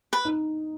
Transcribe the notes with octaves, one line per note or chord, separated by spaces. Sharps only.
B4
D#4